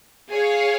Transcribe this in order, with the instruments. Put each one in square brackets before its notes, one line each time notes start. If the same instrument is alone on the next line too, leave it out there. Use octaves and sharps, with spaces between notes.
[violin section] G#4 C#5 F5